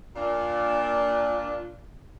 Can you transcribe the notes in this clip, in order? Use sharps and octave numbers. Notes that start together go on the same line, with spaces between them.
A#2 D4